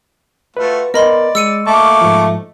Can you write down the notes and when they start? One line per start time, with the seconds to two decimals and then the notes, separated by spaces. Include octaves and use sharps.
0.57 A3 F4 F#4 B4
0.94 B3 A#4 D5 D#5 B5 C6
1.35 G#3 E6 C#7 D#7
1.67 A3 A#3 A5 C#6 D6
2.01 G#2 F3